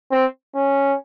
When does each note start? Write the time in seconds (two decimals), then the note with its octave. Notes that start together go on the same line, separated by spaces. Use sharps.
0.12 C4
0.55 C#4